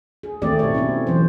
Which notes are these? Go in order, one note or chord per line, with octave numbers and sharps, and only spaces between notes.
G#4
D#3 A3 C4 G4 D5
B2 C#5
C4 C#4 E4
E3 F#3 C5